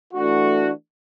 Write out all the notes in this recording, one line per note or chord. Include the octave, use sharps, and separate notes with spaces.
E3 A3 D4 F#4